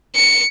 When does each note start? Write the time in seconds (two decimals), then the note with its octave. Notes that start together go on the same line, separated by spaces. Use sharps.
0.15 C#7